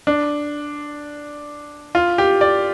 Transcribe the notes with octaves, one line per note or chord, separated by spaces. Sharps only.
D4
F4
G4
D5